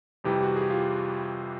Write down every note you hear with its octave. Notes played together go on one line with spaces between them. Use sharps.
F2 C3 E3 G3 G4
F#4
G#4
G4
F4